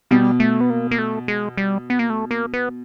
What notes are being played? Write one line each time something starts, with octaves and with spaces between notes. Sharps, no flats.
B2 G3
A3
B3
A#3
A#3
A3
G#3
G3
B3
A#3
A3
A#3
B3